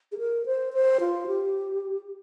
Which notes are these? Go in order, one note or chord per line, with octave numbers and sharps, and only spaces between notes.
G#4
A#4
C5
C5
F4
G4